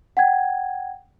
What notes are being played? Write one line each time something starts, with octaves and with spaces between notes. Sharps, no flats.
F#5 G5 G#6